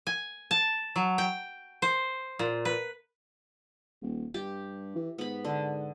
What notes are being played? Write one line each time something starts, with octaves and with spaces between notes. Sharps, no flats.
G#5
A5
F#3
G5
C5
A#2
B4
D#1
G2 G4
E3
G#2 B3 B5
D3